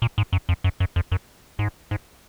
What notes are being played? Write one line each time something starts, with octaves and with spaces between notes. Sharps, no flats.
A#2
G#2
F#2
F2
F#2
F#2
F2
F#2
G#2
G#2